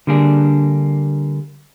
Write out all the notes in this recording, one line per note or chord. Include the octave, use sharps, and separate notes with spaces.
D3 G3 A#3 D4 G#4